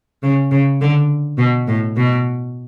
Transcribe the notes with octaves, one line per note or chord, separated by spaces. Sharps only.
C#3
C#3
D3
B2
A2
B2